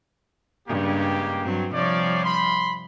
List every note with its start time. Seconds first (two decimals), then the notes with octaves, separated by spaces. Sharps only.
0.68 G2 C#3 G#3 A#3 G4
1.43 G2 F#3 C4
1.74 C3 F3 G3 C#5 D5
2.25 B5 C6